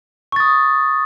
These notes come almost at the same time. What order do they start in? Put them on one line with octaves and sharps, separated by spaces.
C#6 A6 D#6